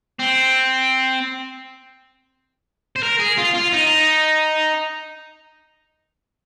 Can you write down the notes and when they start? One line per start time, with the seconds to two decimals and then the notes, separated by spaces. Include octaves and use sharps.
0.19 C4
2.96 C5
3.03 A#4
3.20 G#4
3.38 F4
3.55 F4
3.74 D#4